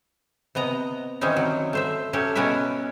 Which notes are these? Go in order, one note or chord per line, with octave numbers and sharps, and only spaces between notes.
C3 B3 D#5 A#5
D#3 E3 G3 C4 C#4 D#4
F#3
A3 C5 E5
F#3 A3 C#4 G4
B2 B3 C#4 A#4 B4 E5